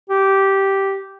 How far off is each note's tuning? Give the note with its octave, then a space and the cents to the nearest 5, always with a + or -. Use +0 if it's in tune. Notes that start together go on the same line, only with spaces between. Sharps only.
G4 -10